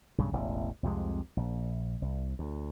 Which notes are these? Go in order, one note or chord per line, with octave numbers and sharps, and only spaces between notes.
B1 G2 C#3
E1 A1
C2 F2 C3 G#3
A#1
C2
D2